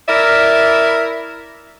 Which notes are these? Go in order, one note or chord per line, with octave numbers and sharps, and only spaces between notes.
E4 A#4 D5 E5